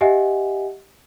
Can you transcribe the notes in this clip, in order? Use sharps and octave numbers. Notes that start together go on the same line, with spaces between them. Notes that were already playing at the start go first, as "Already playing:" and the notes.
G4 D#5 E5 F#5 G#5